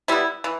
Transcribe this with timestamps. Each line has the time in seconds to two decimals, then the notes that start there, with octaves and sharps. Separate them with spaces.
0.08 G3 B3 E4
0.44 E3